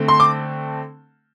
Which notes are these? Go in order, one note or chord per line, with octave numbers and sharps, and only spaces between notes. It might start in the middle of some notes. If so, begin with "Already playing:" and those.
Already playing: D3 A3 C4
C6
D6